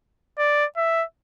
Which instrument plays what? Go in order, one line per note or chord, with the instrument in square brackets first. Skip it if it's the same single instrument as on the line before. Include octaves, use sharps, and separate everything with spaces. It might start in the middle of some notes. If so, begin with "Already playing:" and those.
[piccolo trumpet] D5
E5